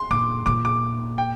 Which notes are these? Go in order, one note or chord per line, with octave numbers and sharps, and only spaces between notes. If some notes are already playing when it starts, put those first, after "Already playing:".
Already playing: C6
A#2 D6
A#2 D6
D6
G5